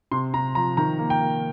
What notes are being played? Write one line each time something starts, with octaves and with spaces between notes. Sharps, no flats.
C3 C6
C3 A#5
F3 A#5
D#3 A#5
A#3
G5
A#3